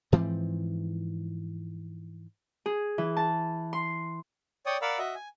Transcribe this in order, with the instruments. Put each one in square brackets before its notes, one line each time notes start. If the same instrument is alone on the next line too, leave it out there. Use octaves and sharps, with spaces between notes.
[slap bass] G#2 E3 F3 C4
[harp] G#4
E3
A5
C6
[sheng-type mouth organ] C#5 D5 G5 D#6
A#4 D5 F5 F#5 B5 E6
F#4 D#5 E5
G#5